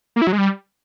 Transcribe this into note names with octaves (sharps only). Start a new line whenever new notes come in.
A#3
E4
F#3
G#3
G3